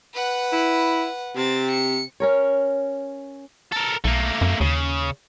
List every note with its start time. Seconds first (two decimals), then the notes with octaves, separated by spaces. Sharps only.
0.15 B4 F#5
0.53 E4
1.36 C3 C4 A6
1.72 C#7
2.20 C#4 A#4 C#5
3.72 A4 A#4
4.04 B1 A3 A#3
4.41 F#2
4.61 D#2 C#3